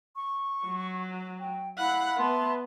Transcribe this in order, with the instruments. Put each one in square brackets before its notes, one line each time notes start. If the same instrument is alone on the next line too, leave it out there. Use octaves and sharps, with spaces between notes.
[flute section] C#6
[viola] F#3
[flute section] G5
[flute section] E4 F5 F#6 [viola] F#5 B5
[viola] B3 [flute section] E5 A5 C6